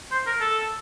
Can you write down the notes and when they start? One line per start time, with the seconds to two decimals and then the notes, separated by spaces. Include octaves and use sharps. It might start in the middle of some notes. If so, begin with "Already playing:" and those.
0.12 C5
0.26 A#4
0.40 A4